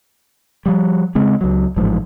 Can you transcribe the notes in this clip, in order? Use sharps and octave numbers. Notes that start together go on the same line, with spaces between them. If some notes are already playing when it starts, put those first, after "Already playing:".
F3 G3
C#3 G#3 C4
C#2 F#3
A1 G#2 F3